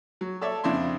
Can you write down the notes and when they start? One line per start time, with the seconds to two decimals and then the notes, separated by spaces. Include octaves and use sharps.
0.21 F#3
0.41 A4 C#5 D5 E5 A5
0.64 F2 C#3 D4 E4 C6